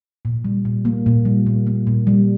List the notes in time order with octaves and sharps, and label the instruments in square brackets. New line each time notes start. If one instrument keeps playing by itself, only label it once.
[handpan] A#2
G3
A#2
A#3
A#2
G3
A#2
A#3
A#2
G3